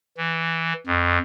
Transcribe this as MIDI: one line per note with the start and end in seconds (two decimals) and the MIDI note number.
0.17 0.73 52
0.86 1.18 41